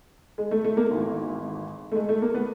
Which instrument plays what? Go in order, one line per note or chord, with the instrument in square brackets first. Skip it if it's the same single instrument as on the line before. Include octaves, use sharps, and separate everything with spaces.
[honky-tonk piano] G#3
A3
A3
A#3
G#1 G#2 E3
A3
G#3
A3
A#3
B3